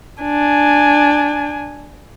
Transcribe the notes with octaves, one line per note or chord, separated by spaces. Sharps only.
D4 G#5